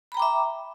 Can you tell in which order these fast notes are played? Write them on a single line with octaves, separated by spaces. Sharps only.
B5 A#5 G5 D6 E5